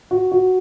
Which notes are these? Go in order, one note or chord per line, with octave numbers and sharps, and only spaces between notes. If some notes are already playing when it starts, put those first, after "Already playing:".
F#4
F#4